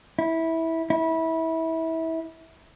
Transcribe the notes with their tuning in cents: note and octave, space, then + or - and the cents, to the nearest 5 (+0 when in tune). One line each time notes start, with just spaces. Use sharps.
E4 -15
E4 -25